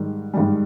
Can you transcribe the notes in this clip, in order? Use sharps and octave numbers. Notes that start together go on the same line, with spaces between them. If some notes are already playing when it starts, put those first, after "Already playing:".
Already playing: G#2 D#3 G3
G#2 D#3 G3